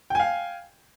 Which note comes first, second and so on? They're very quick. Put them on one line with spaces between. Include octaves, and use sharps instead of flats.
G5 G#5 F5